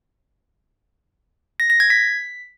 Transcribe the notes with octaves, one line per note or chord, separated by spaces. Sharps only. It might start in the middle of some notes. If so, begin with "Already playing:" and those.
A#6
A#6
G#6
B6